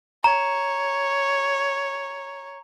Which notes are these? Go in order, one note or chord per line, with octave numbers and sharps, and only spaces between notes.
C#5 A#5